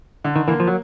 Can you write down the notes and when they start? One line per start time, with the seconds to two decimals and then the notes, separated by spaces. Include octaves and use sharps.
0.24 D3
0.36 D#3
0.48 E3 A#3
0.60 F3
0.67 F#3